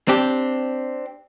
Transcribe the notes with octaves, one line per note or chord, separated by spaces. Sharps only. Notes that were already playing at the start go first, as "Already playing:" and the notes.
C4 D4 G4